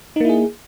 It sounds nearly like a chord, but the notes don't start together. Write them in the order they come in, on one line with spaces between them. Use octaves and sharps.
D#4 A#3 E4 G#4